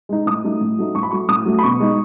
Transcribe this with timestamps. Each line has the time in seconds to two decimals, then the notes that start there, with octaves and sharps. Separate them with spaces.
0.09 G#3 D#4
0.26 A2 D#6
0.44 F#3 A3 D#4
0.61 A2
0.78 F#3 A3 D#4
0.95 A2 C#6
1.03 B5
1.11 F#3 A3 C#6
1.28 A2 D#6
1.46 F#3 A3
1.59 B5
1.63 B2 C#6
1.80 G#3 D#4